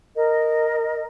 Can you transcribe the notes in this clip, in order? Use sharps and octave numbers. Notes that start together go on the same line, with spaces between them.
A#4 D#5